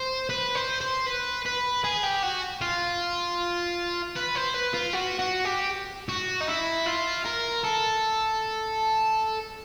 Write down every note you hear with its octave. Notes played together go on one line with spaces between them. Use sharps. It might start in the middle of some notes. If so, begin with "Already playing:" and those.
Already playing: C5
B4
C5
C5
B4
B4
G#4
G4
F#4
F4
B4
C5
B4
F4
F#4
F#4
G4
F#4
D#4
E4
F4
A#4
A4